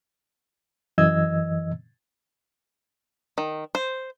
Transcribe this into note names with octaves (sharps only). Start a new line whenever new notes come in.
F#2 E3 D#5 E6 G#6
D#3
C5